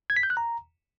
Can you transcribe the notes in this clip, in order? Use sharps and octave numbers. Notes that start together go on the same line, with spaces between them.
G#6
B6
G6
F#6
A#5